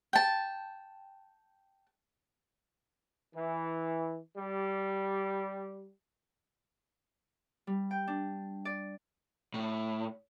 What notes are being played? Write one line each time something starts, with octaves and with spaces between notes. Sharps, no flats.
G5 A5
E3
G3
G3
G5
D4
D5
A2